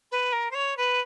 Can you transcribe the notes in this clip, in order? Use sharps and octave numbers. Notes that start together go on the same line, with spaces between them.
B4
A#4
C5
C#5
B4